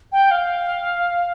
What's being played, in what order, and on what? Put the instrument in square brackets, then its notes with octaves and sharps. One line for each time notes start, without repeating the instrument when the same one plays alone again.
[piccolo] G5
F5